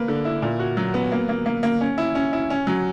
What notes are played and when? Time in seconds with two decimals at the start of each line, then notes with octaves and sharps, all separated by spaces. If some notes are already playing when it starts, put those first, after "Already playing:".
Already playing: A#3 B4
0.08 D3
0.25 E4
0.42 A#2
0.59 F#4
0.77 F#3
0.94 B3
1.12 A#3
1.29 A#3
1.46 A#3
1.63 A#3
1.81 C#4
1.98 E4
2.15 C#4
2.33 E4
2.50 C#4
2.67 F#3